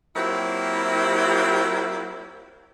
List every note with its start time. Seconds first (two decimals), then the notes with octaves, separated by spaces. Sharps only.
0.15 F#3 A#3 C4 E4 F4 G4